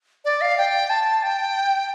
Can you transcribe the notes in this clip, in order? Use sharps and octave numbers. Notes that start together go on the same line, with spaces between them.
D5
F5
G5
A5
G5